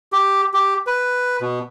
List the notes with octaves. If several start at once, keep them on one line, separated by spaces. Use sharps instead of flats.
G4
G4
B4
B2